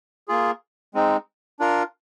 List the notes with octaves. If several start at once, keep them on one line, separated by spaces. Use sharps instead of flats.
A#3 F4 G#4
G#3 C4 D#4
D4 F4 A#4